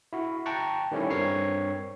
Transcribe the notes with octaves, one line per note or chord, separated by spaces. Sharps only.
E4 F#4
G5 A5 A#5 C#6 F#6
D#3 G3 A3 C#4 E4 C#5
G2 C4 A#4 C#5 C7